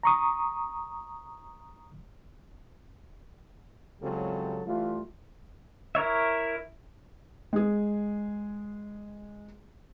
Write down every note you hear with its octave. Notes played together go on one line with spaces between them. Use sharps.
A#5 C#6 D#6
C#2 C#3 F#3 G3 C4 A4
E3 G3 A3 F4
E4 A#4 C#5 E5
G#3 G#4